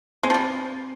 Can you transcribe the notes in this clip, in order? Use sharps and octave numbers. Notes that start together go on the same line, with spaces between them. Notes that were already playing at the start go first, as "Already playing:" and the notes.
G#3 C4
F3
G3